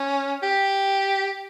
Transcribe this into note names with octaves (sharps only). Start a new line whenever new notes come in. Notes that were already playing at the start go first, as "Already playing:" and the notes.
Already playing: C#4
G4